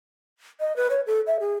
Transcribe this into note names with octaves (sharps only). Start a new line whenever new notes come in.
D#5
B4
C#5
A4
E5
G#4